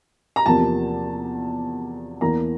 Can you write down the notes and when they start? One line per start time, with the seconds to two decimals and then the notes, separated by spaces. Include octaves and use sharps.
0.36 A#5
0.46 E2 C3 F3 A#3 A5
2.21 E2 E3 A#3 A#5